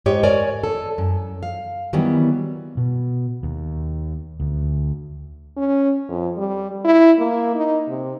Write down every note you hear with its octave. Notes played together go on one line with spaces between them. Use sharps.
G#2 G4 C#5 D#5
A#4 C#5 D5 G#5
A4
F#2
F5
D#3 E3 F#3 G3 B3
B2
D#2
D2
C#4
F2
G3
E4
A#3
D#4
C3